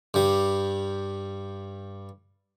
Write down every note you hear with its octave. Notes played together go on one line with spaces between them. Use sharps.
G2 G3